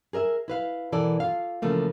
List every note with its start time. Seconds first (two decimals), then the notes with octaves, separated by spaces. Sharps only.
0.13 G#4 A#4 D#5 E5
0.48 E4 B4 F5
0.92 B2 E3 A4 A#4 D5
1.20 F4 F5
1.62 C#3 E3 F3 A3 A#3